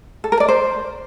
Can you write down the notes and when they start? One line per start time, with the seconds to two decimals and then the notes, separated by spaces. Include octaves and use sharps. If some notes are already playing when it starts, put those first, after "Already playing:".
0.24 A4
0.32 A#4
0.40 D5
0.48 C5